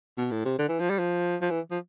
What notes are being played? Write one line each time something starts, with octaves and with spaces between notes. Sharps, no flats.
B2
A2
C3
D3
E3
F3
G3
F3
F3
E3
F3